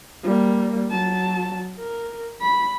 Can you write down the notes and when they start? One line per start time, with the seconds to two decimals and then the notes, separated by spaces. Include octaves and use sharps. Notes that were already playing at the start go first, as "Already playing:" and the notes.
0.23 G3 A#3
0.91 F#3 A5
1.79 A#4
2.41 B5